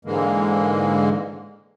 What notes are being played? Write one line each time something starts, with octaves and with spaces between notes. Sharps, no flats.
G#2 D3 E3 G#3 A#3